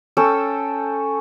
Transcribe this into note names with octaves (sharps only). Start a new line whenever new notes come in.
C#4 A4 G5 E6